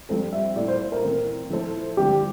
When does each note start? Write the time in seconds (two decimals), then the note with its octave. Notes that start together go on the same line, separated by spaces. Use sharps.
0.09 G2 F3 C4 A4
0.33 E5
0.56 A#2 A3 E4 D5
0.68 C5
0.80 C5
0.92 A#4
1.03 E3 A3 C4
1.50 F3 A3 E4 A4 C5
1.97 G2 D3 F3 C4 G4